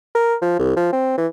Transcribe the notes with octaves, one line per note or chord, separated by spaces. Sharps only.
A#4
F3
C2
F3
C4
E3